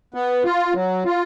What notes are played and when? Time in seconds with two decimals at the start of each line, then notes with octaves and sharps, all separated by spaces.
0.14 B3
0.44 F4
0.75 F#3
1.05 F4